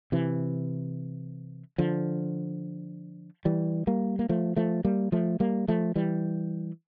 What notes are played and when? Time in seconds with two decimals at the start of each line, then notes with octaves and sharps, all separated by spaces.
0.12 C3 E3
1.78 D3 F3
3.45 E3 G3
3.87 G3 A#3
4.19 A#3
4.29 F3 A3
4.57 F3 A3
4.85 G3 A#3
5.12 F3 A3
5.40 G3 A#3
5.68 F3 A3
5.96 E3 G3